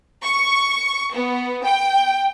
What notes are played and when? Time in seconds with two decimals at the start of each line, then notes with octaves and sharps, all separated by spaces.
0.24 C#6
1.15 B3
1.65 G5